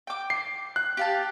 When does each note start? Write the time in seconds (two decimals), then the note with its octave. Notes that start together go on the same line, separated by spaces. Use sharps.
0.07 G5 D6
0.30 C7
0.76 F#6
0.97 G4 F5 A5